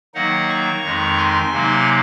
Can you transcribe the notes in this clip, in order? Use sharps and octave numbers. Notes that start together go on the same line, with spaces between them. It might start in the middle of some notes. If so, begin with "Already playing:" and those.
D#3 F#3 A#3 D#4 D#5 F#5
A#5 C#6
F2 D#3 G#3 D#4
G#5 C6
C3 F#3 A#3 D#4